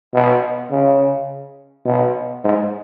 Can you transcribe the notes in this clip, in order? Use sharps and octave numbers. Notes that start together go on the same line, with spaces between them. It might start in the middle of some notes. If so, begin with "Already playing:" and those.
B2
C#3
B2
G#2